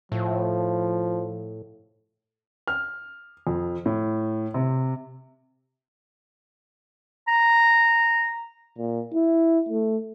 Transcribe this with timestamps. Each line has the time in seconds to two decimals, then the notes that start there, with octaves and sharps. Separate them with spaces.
0.12 A2 F3
2.68 F6
3.47 F2
3.86 A2
4.54 C3
7.28 A#5
8.78 A#2
9.14 E4
9.69 A3